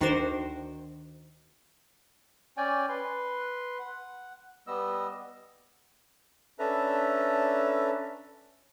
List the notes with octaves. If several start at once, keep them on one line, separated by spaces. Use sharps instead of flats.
D2 D#3 D4 F#4 A#4 C5
C#4 D5 G5 G#5
B4 C6
F#5
G3 B3 D#5 E6
C#4 D4 A4 B4 E5 A#5